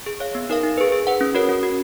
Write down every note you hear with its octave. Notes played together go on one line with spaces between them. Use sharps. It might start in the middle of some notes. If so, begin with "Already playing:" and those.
G#4
C#5 F5
B3
D#4 A#4 F5
D#4
G#4 B4
G#4
B4 F#5
C#4
F#4 A#4 C#5
C#4
F#4